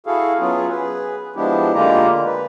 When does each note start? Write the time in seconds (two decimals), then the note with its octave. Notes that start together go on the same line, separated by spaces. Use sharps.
0.07 E4 F#4 G#4 A4 F5
0.40 F#3 B3 C#4 F4 G#4
0.70 G#4 B4
1.36 F3 G#3 B3 D4 E4 G4
1.75 D3 G#3 A#3 F4 G4 A#5
2.25 B4